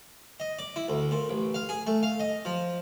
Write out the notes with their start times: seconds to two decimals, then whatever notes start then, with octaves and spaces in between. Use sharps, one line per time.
0.40 D#5
0.59 D5
0.76 E4
0.88 D2
1.11 A#2
1.29 A1
1.54 F5
1.69 G#4
1.87 A3
2.03 F5
2.20 D#5
2.45 F3